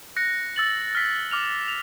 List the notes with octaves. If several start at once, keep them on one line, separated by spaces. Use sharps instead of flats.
F#6 A#6 C#7
E6 A6 F#7
F6 B6
D6 F6 F7
F7